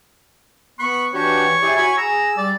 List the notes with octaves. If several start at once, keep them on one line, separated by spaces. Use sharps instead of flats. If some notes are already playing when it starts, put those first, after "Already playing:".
B3 B5 C#6 F#6
E3 D4 F#4 G4 C#5
E4 G4 G#4 D5
F#4 G#5 B5
G#4 A#5 E6
G3 D5